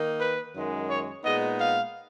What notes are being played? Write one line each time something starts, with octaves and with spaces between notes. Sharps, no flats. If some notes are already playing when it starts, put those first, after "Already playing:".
Already playing: D#3 A#3 D#4
B4
F#2 D#3 G#3
C#5
A#2 G#3 B3 D#4 D#5
F5